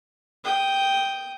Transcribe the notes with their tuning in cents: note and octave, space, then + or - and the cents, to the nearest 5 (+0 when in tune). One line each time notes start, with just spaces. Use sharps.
G5 +0 D#6 +0